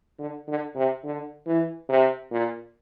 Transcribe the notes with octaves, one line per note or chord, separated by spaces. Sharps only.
D3
D3
C3
D3
E3
C3
A#2